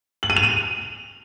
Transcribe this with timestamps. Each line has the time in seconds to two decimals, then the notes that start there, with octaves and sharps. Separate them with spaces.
0.23 F#7
0.30 D#7
0.37 F7
0.43 D#7